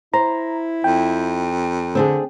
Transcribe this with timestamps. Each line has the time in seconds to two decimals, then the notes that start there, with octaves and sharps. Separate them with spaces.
0.14 E4 C5 A#5
0.84 F2 G5
1.95 D3 C4 D4 G#4